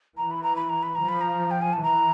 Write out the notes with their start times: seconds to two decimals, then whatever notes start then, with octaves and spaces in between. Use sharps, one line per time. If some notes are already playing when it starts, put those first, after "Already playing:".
0.17 E3 A#5
0.31 B5
0.43 A#5
0.56 B5
0.69 A#5
0.83 B5
0.95 A#5
1.00 F3
1.08 B5
1.21 A#5
1.51 G5
1.62 G#5
1.73 A5
1.83 E3 A#5